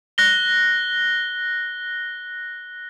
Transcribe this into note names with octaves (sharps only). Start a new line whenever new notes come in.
F#6 A#6 G7